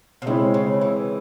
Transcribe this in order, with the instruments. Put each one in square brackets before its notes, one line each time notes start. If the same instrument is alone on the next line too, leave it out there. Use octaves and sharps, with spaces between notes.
[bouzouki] C3
[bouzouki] C#3 [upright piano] G#3 C4 E4
[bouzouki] C#3
E3